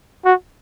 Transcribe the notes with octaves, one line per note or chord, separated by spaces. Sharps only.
F#4